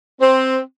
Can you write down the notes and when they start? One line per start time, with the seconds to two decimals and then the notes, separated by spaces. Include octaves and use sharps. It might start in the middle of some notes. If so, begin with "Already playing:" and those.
0.19 C4